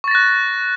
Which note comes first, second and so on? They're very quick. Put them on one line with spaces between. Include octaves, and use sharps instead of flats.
C#6 A6 A#6 F#6